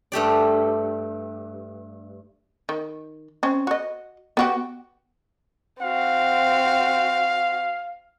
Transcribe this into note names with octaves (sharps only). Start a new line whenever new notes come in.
G2 A3 G4 D5
D#3
C4 C#4
F#4 D#5
B3 F#4 G4
C4 F#4 F5